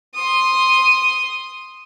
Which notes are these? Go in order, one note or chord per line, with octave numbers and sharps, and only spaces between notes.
C6 D#6